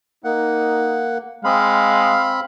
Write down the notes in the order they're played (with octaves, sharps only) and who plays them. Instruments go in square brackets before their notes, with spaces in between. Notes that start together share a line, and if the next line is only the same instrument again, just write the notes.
[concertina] A#3 F#5 [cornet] D#4
[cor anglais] G#3 [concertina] C4 B5 [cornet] F5